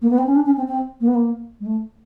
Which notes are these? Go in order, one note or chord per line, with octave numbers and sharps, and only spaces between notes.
A#3
B3
C4
C#4
D4
C#4
C4
C4
A#3
B3
A#3
G#3
A3